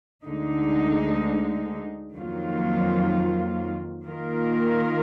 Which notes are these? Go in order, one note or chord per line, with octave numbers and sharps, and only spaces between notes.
D2 D3 G#3 D#4
F2 D#3 F#3 A#3 F4
D#3 A#3 F4 A#4